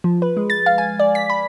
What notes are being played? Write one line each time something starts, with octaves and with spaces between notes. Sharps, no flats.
F3
B4
G#3
A6
F5
G#5
D5
B6
B5